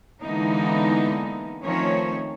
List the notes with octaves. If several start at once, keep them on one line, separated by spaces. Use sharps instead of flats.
D3 E3 G#3 A#3 B3 D#4
D#3 F3 A3 C4 C#4 C#5